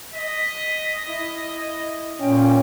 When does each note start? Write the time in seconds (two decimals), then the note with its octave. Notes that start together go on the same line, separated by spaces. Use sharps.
0.14 D#5 B6
1.08 E4
2.20 A#2 C#4 G5